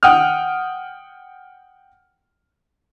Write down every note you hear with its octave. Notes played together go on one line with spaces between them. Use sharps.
F#5 G5 D#6 F6